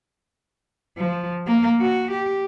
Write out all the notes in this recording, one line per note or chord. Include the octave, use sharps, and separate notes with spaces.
F3
A#3
F#4
G4